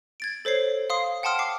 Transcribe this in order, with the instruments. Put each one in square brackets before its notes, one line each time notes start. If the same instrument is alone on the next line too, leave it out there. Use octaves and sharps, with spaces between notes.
[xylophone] G#6 A6 D7
A4 C5 C#5 C7
F5 C6 D#6 C7
F#5 G5 A5 C6 D#6 F6
D6 C7